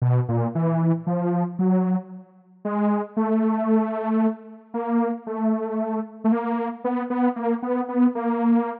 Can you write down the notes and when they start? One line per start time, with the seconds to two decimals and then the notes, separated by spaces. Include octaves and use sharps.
0.02 B2
0.29 A#2
0.55 E3
1.07 F3
1.59 F#3
2.65 G#3
3.17 A3
4.74 A#3
5.27 A3
6.24 A3
6.32 A#3
6.84 B3
7.10 B3
7.36 A#3
7.63 B3
7.88 B3
8.15 A#3